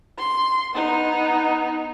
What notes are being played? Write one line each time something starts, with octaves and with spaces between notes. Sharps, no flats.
C6
B3 D#4